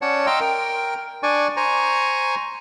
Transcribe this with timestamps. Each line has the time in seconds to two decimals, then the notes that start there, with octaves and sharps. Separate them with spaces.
0.02 C#4 C#5 D5 F#5 A5
0.26 D#5 F5 G5 A#5 C6 E6
0.40 A#4 G5
1.23 D4 D5 G#5 C#6
1.57 C5 G#5 A#5 C#6